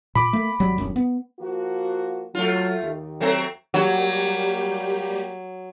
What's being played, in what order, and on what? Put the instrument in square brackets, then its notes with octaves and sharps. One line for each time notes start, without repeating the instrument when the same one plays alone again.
[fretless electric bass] A#2 [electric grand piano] B5 D6
[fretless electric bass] A3 A#3
G#1 F#3 G3
D#1 F#2
B3
[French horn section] F3 A#3 F#4
[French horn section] F#3 [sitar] A3 F4
[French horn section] D#2
[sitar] F#3 A3 C4
[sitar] F#3 [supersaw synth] G3 A#3 G4